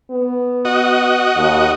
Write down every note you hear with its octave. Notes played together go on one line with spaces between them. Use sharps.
B3
F#4 D#5
D#2